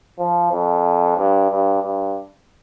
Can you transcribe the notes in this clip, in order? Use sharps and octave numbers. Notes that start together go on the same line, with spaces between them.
F3
F2
G2
G2
G2